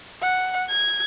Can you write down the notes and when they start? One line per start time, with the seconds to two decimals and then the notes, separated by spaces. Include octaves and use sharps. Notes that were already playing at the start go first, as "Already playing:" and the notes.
0.22 F#5
0.70 G#6